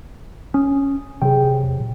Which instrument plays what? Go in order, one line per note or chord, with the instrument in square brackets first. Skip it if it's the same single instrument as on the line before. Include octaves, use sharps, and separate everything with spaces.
[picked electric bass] C#4 [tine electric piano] D#6
[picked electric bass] C3 F#3 [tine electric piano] G#4 G5
[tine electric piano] E2
A#2